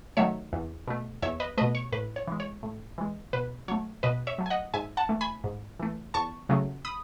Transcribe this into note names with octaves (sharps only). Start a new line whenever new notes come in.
D#3 F#3 A3 C#5 E5
E2
B2 A3
E2 C#5 E5
B4 D#5
B2 A3 B4 D#5
C#5
A2 B4
C#5
E3 G#3
C#5
A2
E3 G#3
B2 B4
F#3 A3 C#5
B2 B4 D#5
C#5 E5
F#3 A3
G#5
D#5 F#5
G#2 E5 G#5
F#5 A5
E3 A3
G#5 B5
G#2
E3 A3
E2 A5 C#6
C#3 F#3 A3
B5 D#6